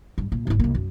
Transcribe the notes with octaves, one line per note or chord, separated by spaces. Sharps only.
G2
A#2
G#1 E4
C2 A#3
F#2